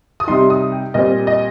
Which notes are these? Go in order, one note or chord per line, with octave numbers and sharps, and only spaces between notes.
D#6
C3 G3 D#4 C6
D#6
G5
A#2 G3 C4 D#5
D#5